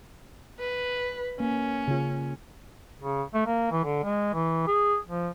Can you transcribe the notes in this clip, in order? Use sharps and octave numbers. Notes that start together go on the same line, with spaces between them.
B4
A#3 C#4
C#3 F4
C#3
A3
A#3
E3
D3
G#3
E3
G#4
F3